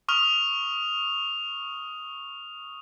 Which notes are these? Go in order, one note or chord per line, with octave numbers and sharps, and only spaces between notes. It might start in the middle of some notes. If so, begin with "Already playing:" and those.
C#6 D#6 F6 F7